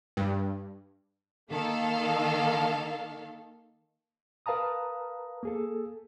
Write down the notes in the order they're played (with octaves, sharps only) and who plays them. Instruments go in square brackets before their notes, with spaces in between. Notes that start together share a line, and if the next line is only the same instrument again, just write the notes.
[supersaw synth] G2
[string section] D#3 A#3 A4 F5
[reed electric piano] A#4 B4 F5 A5 A#5 D#6
A#3 G#4 A4